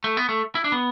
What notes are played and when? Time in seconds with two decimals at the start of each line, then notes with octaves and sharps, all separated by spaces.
0.04 A3
0.17 B3
0.29 A3
0.55 E4
0.64 D4
0.72 B3